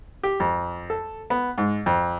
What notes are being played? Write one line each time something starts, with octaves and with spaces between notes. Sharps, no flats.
G4
F2
A4
B3
G#2
F2